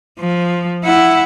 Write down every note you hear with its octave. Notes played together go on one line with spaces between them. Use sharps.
F3
E4 F#5